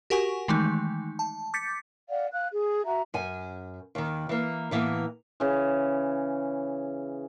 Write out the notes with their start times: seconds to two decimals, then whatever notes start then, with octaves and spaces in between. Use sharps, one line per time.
0.10 F#4 G4 A#4 F#5 G#5 C#6
0.48 D#3 E3 G#3 A3 D#4
1.19 A5
1.54 D6 G6 A6 B6 C#7
2.10 D5 F5 F#5
2.32 F5 F#6
2.51 G#4
2.86 F#4 E5 A#5
3.14 F#2 G#5
3.95 D#2 D#3
4.29 E3 A#3
4.71 A2 E3 A#3 B3
5.40 C#3 E3